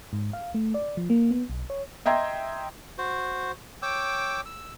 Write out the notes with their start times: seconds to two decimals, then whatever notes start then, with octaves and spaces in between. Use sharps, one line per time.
0.13 G#2
0.33 F5
0.54 A3
0.74 D5
0.97 F3
1.10 A#3
1.31 B3
1.50 B1
1.70 C#5
2.06 D#5 E5 G5 A#5 C6 G#6
2.98 F#4 C5
3.82 C#5 G5 D6 E6
4.46 E6